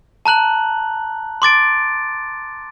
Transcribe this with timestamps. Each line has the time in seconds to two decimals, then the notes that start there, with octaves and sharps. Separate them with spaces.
0.26 A5 A#5 F#6 F#7
1.42 C6 D6 A6 D7